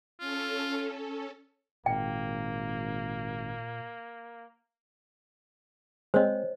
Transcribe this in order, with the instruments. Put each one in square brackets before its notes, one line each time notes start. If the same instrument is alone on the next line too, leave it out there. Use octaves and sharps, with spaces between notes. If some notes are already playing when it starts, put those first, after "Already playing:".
[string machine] C#4 A4 [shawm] F4
[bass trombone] G#1 [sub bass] A#2 [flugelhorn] A#3 [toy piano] G5
[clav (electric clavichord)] G#3 C4 [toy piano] C5 C#5 D#5